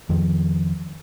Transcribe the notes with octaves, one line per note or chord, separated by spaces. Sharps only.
F2 D#3 F3